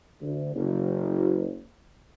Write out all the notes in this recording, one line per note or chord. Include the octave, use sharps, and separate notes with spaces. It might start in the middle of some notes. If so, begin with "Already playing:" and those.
D2
F#1